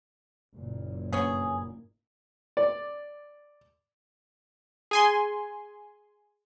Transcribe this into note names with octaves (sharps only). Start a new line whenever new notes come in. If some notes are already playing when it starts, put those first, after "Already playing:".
F#1 A#2
G2 A#3 B3 C#4 G#4
D5
G#4 G#5 C6